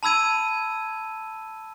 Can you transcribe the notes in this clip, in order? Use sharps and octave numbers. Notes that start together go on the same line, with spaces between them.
A5 B5 E6 G#6 D#7